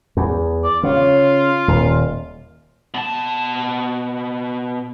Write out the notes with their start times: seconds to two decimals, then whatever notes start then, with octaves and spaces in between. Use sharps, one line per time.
0.17 E2
0.64 D5
0.83 C#3 F4
1.68 D#1
2.94 B2 A5